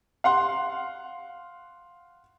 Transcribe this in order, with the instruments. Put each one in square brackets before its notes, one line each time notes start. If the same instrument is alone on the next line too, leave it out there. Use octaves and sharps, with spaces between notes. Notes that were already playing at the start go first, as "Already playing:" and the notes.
[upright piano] F5 F#5 C6